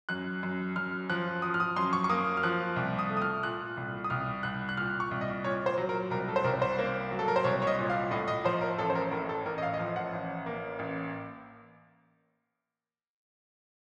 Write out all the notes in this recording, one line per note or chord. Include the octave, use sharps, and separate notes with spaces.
F#2 F#6
F#2
F#2 F6
F3 F#6
F3 D#6
F6
D#6
F#2 C6
C#6
C#6
A#3 D#6
F6
F3 F#6
C2
D#6
A3
D#6
F6
A#2 F#6
C2
D#6
C2 F6
C2 F#6
F#6
A#2 F6
C#6
C2
D#5
A#2 C#5
C5
F#3
A#4
C2 A#4
A4
C5
C2 A#4
C5
A#3
F#3
A4
A#4
C5
C2 C#5
C#5
D#5
A#2
F5
A2 D#5
D#5
F3 C5
A#4
A1 A4
C5
A#4
A2 A#4
A4
A1 A#4
D#5
F5
D#5
F3 F5
F#5
A1
A#3
A1